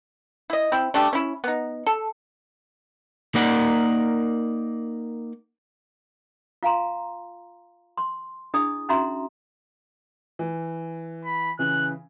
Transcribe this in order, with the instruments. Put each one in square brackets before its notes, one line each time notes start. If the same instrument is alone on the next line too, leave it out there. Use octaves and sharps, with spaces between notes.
[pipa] E4 D#5
C4 E4
A3 D4 G4
C#4 E4
B3 D#4
A4
[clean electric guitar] A#3 D#4 A#4 D5 F#5
[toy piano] F4 F5 G#5 A#5 C6
C6
D4 E4 G#4 D#5 D#6
C#4 D#4 F#4 E5 A#5 C6
[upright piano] E3
[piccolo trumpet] B5
[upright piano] C#3 E3 [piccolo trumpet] F#6